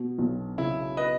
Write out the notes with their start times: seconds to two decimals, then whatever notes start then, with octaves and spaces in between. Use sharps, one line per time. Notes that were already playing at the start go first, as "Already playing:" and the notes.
Already playing: B2
0.18 B1
0.58 C#3 E4
0.97 B4 D#5